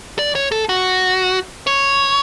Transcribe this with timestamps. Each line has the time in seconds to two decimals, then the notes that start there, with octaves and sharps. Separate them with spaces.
0.19 D5
0.35 C#5
0.52 A4
0.69 F#4
1.67 C#5